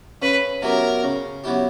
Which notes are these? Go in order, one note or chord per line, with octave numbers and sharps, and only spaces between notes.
C#3 B4
F#3 B3 E4 G4 A#4
C#3
F#3 B3 E4 G4